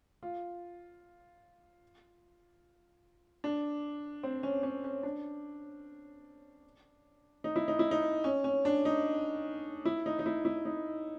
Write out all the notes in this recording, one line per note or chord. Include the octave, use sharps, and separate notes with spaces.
F4
D4
C4
C#4
C#4
C#4
D4
D#4
E4
D#4
E4
D#4
C#4
C#4
D4
D#4
E4
D#4
D#4
E4
E4
D#4